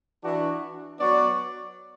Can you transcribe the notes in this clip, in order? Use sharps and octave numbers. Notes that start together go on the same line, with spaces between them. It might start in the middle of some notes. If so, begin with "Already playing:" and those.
E3 D4 F#4
F#3 B3 F#4 D5